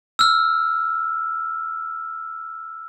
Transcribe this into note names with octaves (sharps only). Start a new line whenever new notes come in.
E6 F6